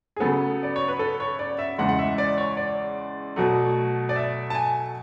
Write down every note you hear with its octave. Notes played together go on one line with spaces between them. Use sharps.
G#4
C#3 F#3 B3 A4
D5
C#5
B4
A4
C#5
D5
E5
E2 C#3 G#3 F#5
F#5
E5
D5
C#5
D5
B2 F#3 A3
D5
E5
A5
G#5